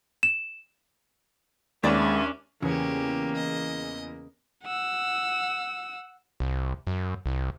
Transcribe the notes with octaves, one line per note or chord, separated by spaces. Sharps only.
E7
D#2 G#3 B3 C#4 D4 D5 E5
E2 C#3 A#3 B3 C#4 G4 G#5
D#5
F#5 E6
C2
F#2
C2